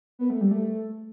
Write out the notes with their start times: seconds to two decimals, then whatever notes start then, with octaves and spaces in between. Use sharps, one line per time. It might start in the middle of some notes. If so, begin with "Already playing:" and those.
0.19 B3
0.30 A3
0.41 G3
0.51 A3